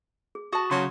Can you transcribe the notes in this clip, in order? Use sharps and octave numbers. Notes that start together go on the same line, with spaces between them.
G#4
F#4 A5 D#6
C#3 F#3 C6